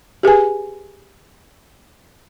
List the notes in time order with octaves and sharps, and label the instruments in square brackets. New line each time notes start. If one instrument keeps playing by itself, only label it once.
[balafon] G4 G#4 B4 G#5